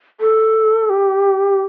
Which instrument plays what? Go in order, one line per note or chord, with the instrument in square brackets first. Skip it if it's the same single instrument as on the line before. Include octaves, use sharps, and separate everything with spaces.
[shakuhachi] A4
G4